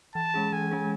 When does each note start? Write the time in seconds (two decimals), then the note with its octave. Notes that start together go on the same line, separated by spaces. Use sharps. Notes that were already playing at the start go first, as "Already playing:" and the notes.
0.15 E3 A5
0.34 G#3 C#4 G#4
0.52 E3 G#5
0.71 G#3 C#4 G#4